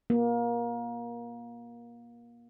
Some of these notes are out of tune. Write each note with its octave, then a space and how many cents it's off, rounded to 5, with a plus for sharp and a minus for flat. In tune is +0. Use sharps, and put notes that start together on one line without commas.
A#3 +25